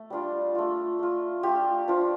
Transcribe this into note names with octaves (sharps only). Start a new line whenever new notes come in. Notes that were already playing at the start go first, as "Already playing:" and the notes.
Already playing: A3
G3 D4 F4
A3 F4
A3 F4
A3 D4 F4 G4
F3 D4 F4